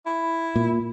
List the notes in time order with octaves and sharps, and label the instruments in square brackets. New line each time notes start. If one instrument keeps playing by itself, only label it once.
[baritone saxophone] E4
[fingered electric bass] A#2